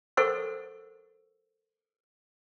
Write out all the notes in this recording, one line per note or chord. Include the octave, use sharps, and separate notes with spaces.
A4 A#4 C5 F#5 C#6 E6